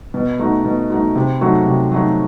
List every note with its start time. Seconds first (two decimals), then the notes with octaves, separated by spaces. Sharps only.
0.14 B2
0.39 A3 D#4 F#4
0.65 B2
0.90 A3 D#4 F#4
1.15 C3
1.41 F#3 A3 D#4 F#4
1.66 C3
1.92 F#3 A3 D#4 F#4